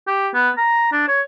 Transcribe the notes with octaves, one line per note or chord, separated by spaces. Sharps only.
G4
B3
A#5
D4
C#5